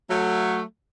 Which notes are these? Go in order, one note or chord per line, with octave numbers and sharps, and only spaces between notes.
F#3 A3